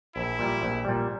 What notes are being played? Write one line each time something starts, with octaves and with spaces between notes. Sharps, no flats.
A#1 E4
A#2 G3
A#1
A#2 G3